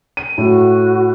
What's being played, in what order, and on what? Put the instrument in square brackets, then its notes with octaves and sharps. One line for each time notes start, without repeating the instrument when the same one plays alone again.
[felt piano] D#7
[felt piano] A2 [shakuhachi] F#4